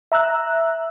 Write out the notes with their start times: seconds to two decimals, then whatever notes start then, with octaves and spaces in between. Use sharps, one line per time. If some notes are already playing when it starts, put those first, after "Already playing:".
0.12 E5 A#5 E6 F#6